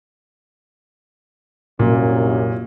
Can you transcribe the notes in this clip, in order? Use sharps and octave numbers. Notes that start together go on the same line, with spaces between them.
C2 F#2 A#2